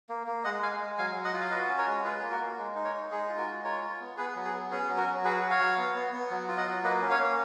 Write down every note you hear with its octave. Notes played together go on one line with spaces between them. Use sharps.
A#3
A#3
G#3 D#5 F#5
G#3 F5 G#5
G#3
F#3 F5 G#5
F#3
D#5 F#5
F4
F5
F#4 B4 D#5
C#4
A#4 C#5
G#3
F4 G#4 B4
A#3
F#4 A#4
A#3
G#3
D#4
A#4 C#5
D#4
G#3 G#4
F4
F#4 A#4
G#3
F4 A#4 C#5
F4
B3
B3 G#4 B4
F#3
G#4
B3
C#4 G#4
F#3
F#4 A#4
F#3
F#4 G#4 B4
F#4
C#5 F5
F#3
B3
B3
B3
F#3
F4
D#5 F#5
F#3
A#3 B4 D#5
C#4
C#5 F5
A#3